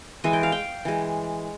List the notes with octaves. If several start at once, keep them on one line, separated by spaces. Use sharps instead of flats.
E3 G#3 G#5
G5
F5
G5
E3 G#3